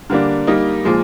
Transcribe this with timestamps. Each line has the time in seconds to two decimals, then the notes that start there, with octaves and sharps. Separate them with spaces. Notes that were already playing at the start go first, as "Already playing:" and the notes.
0.10 D3 G3 A#3 D4
0.47 G3 A#3 D#4
0.85 A#2 F3 G#3